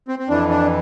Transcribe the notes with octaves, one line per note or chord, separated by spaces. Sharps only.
C4
C4
F2 E3 D4
D4